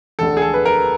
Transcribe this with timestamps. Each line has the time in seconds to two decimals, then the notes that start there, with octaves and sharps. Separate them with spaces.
0.19 E1 D2 D3 A4
0.37 G#4
0.42 A4
0.54 B4
0.65 A#4